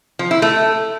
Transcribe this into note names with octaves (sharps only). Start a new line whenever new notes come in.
F3
E4
A3